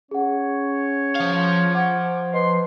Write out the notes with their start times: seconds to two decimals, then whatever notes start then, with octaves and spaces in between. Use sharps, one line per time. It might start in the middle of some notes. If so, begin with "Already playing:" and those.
0.11 C#4 G#4 C#5 F#5
1.15 F3 F5
1.75 F#5 D6 G#6
2.34 B4 D#5 C6